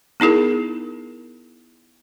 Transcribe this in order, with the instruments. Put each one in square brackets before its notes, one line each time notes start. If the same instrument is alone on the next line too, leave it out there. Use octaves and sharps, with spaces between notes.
[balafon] B3 D#4 E4 G#4 A#4